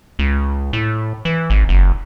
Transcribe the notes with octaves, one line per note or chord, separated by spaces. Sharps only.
C#2
A2
E3
G#1
F#1